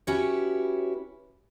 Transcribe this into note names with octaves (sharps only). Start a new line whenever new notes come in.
C#4 E4 F#4 G4 B4 C#5